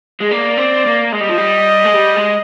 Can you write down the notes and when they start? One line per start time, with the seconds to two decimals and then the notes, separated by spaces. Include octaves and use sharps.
0.20 G#3
0.31 A#3 D5
0.57 C4
0.86 A#3
1.12 G#3 D#5
1.21 G3
1.30 F3
1.38 G3
1.85 G#3
1.95 G3
2.16 G#3